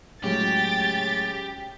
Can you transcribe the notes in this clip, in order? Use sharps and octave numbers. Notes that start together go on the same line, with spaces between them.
A2 C#3 F#3 G#3 G4 A6